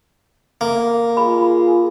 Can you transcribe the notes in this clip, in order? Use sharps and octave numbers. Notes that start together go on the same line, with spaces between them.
A#3
F4 G#4 B5